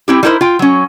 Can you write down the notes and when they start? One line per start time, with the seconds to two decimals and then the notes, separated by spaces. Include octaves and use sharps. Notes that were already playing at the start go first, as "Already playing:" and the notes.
0.08 C4 E4 G4
0.23 G3 D#4 E4 A#4 C5
0.41 F4 G5
0.59 F#3 C#4